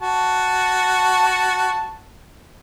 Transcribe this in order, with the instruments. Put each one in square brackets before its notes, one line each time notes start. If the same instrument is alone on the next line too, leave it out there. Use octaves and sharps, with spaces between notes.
[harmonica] F#4 A5